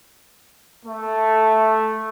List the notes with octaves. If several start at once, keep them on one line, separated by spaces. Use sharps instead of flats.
A3